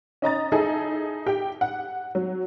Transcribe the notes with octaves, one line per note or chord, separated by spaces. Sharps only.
C#4 D#5 A#5 A6
D#4 E4 G#4 A4
G4 G5
F#5
F#3